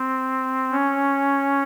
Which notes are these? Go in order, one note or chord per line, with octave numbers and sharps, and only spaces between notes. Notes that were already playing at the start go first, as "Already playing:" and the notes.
Already playing: C4
C#4